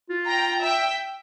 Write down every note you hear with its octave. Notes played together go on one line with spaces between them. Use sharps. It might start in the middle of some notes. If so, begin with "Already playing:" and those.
F4
G5 A#5
E5 G5